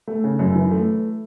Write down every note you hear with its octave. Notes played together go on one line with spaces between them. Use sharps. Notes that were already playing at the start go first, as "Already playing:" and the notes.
A3
C#3
F#2
E3
A3